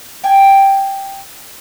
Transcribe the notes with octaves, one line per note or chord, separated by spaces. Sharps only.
G5 G#5